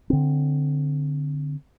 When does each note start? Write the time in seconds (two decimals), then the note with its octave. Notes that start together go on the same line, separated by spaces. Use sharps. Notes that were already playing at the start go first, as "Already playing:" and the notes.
0.10 D3 C4